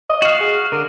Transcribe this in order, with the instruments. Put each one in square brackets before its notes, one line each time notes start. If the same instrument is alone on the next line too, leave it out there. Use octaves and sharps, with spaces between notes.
[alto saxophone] D#5
[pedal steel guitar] F#4 F5
[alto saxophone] G#4
[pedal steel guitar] D3 [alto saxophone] A#4